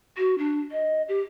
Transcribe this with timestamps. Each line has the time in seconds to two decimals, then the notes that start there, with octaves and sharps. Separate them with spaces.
0.17 F#4
0.38 D4
0.72 D#5
1.08 G4